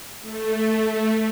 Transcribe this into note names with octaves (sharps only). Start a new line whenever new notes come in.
A3